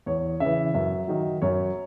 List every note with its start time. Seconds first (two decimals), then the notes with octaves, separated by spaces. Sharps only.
0.06 E2 C#5
0.40 C#3 E3 E5
0.74 F#2 E5
1.08 D#3 F#3
1.42 F#2 C#5